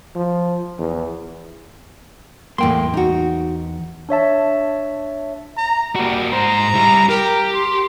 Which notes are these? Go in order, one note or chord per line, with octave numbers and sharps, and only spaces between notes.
F3
E2
E2 A2 A#3 G5 C6
D#4 F#4
D4 C#5 E5 A5
A#5
G3 A#3 F#4
G#2 C5 A#5
G3 E4
G4 A#4
C6